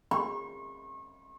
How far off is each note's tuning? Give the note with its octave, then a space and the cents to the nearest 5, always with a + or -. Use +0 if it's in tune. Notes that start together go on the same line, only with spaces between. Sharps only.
C#6 -35